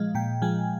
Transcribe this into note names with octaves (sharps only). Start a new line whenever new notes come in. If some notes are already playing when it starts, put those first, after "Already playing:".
Already playing: A#2 F3 G#3 D#5 F5
A#2 G5
F3 G#3 G#5